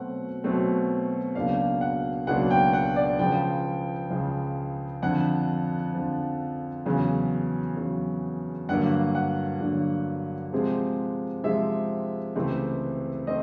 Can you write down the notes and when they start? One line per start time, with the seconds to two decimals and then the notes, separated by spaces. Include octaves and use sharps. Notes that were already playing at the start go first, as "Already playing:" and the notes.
Already playing: B2 F#3 A3 C4 F#5
0.44 B2 F#3 A3 C4
1.35 C#2 B2 F#3 A#3 D4 F5
1.81 F#5
2.27 C#2 B2 F#3 A#3 D4 F#5
2.51 G5
2.73 F#5
2.96 D5
3.19 C#2 C#3 F3 G5
4.10 C#2 C#3 F3
5.02 F2 D3 F3 F#5
5.94 F2 D3 F3
6.86 E2 C#3 F#3
7.77 E2 C#3 F#3
8.69 G2 D3 F#3 A#3 F#5
9.15 F#5
9.60 G2 D3 F#3 A#3
10.53 C3 F3 G#3 C4
11.44 C3 F3 G#3 C4 E5
12.36 C#2 C3 E3 A3 C4
13.27 A3 C4 D#5